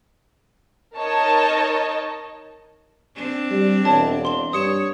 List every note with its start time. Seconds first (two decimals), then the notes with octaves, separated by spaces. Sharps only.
0.96 D#4 A#4 C#5 D#5 A5
3.16 C4 D4
3.51 G3
3.85 E1 C#5 A5
4.25 C6 G7
4.53 G2 C#5 D#6 C#7 E7